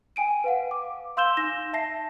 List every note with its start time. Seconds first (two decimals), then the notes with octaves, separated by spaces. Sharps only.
0.16 G5 G#5 D7 D#7
0.44 B4 F5 F#5
0.71 D6
1.17 F5 C6 E6 G6 E7 G7
1.37 D#4 A#6 E7
1.73 E5 A5 A#6 C7